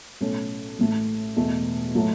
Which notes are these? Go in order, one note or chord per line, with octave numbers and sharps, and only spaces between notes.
B1 A2 A3 C#4 A4
A1 A2 A3
E1 E2 B2 A3
A2 F#3 A3 F#4